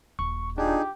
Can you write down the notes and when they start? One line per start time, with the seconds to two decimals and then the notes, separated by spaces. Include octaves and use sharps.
0.19 D#1 C#6
0.58 D4 D#4 F4 G4 G#4